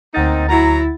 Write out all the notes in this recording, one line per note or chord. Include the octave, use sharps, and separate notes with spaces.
D2 A#3 C4 D#4 F#5 A6
F#3 E4 F#4 A#5